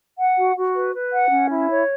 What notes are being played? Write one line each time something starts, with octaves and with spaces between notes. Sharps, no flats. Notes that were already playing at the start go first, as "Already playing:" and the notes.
F#5
F#4
F#4
B4
B4
F#5
C#4
E4
C#5